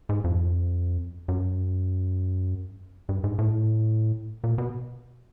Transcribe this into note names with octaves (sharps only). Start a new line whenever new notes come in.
G#2
F2
F#2
G2
G#2
A2
A#2
B2